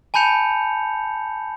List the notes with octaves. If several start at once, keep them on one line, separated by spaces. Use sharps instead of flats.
G#5 A5 B5 G6 C#7 F7